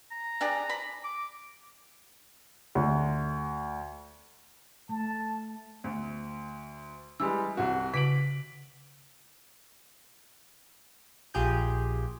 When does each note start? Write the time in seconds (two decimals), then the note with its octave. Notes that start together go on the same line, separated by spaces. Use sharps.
0.11 A#5
0.41 D4 G4 G#4
0.69 B5
1.04 D6
2.75 D2
4.89 A3 A5
5.84 D2
7.20 E3 G3 G#3 E6
7.57 C2 F#4
7.94 C#3 B6 D7 F#7
11.34 A#1 F4 G4 G#4 G6